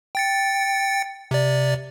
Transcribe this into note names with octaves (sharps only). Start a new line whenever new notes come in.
G5 A6 C#7
C3 D5